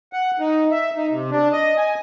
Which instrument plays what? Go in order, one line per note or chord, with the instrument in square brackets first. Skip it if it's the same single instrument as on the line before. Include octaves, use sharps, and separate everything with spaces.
[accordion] F#5
D#4
E5
D#4
C3
D4
D#5
G#5